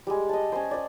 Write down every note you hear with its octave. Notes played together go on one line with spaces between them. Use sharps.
G3 G#3
D#5 A5
C#4 C5
C5 D5